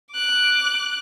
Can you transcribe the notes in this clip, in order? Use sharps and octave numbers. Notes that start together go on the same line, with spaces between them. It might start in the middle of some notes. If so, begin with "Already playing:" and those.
D6 F#6